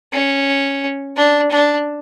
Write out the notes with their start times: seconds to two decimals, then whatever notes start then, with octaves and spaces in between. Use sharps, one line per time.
0.13 C#4
1.16 D4
1.51 D4